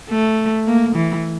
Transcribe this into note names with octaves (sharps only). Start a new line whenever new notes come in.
A3
A#3
E3